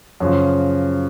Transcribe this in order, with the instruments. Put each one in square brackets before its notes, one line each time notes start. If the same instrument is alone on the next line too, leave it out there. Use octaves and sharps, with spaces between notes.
[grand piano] F#2 C#3 F3